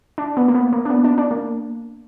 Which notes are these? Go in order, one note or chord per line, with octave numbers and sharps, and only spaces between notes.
D4
B3
A#3
B3
A#3
D4
B3
D4
D4
A#3